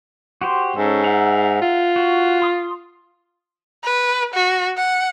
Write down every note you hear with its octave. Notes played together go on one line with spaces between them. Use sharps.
F#4 G4 C5
G#2 C#4 A4
E5 F#5 A#5
F4
F#4
C6 D#6
B4
F#4
F#5